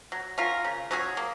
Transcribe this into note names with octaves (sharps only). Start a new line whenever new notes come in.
F#3
C#4 F4 A#4
C#3
F#3 C#4 G#4
A#3